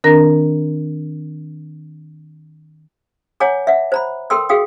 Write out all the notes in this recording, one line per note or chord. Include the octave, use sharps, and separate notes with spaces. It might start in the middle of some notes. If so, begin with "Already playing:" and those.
D#3 C4 D4 A#4 A#5 A#6
C#5 F#5 G#5 A#5 D6
E5 F#5
C5 A#5 B5
A4 A#4 G5 C6 E6
F#4 G#4 F5 G5 D#6